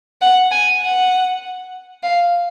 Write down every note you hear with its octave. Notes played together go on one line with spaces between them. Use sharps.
F#5
G#5
F#5
F5